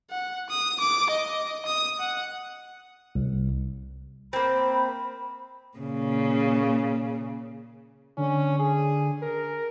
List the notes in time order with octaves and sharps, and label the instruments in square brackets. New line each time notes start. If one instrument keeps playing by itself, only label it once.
[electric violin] F#5
D#6
D6
D#5
D#6
F#5
[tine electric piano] C2
[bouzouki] A#3 C4 [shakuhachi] B5
[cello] A#2 C#3
[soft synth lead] D3 [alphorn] C#4
[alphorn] G#4
A#4